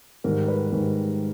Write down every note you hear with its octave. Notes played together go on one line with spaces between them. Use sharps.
G#2 D#3 G3 A#4
B4
G#2 D#3 G3